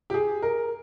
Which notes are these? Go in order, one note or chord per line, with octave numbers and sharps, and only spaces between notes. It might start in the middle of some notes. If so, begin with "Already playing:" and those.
G4
G#4
A#4